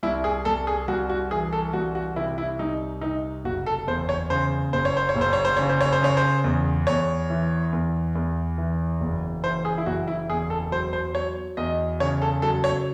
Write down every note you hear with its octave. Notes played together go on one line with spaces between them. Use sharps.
C2 E4
G#4
C2 A4
G#4
C2 F#4
F#4
E3 G#4
A4
C2 F#4
F#4
C3 E4
E4
C2 D#4
C3 D#4
F#1 F#4
A4
E2 C5
C#5
C#3 C5
F#1 C5
C#5
C5
C#5
F#1
C5
C#5
C5
C#3 C#5
C5
C#5
C5
C#3 C#5
C5
E2
E2 C#5
E3
E2
E2
E3
F#1
E3 C5
G#4
E4
F#1 F#4
E4
E2 G#4
A4
F#3 C5
C5
F#3 C#5
E2 D#5
C#3 C#5
A4
F#3 A4
C#5